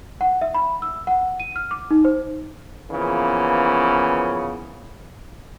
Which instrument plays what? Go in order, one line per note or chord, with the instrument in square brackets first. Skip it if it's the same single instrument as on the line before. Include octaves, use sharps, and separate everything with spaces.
[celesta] F#5
E5
B5
E6
F#5
D#7
F6
D6
D#4
C5
[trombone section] C#3 E3 F3 A#3 B3 C#4